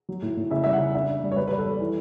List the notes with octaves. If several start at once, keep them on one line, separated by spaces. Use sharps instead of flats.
F#3
A2
A2
C#3 E5
G3 E5
F#5
C#3
D4 E5
D4
G3
C#5
G3 B4
G3 B4
A4
G3
E3